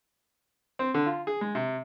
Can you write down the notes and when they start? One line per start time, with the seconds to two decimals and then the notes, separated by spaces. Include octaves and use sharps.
0.79 C4
0.94 D3
1.06 F4
1.27 G#4
1.41 G#3
1.55 C3